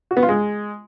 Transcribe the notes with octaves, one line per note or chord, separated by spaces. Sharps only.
F#4
B3
F4
G#3